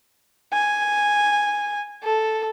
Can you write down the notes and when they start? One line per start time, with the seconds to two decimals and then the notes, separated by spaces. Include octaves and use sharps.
0.53 G#5
2.04 A4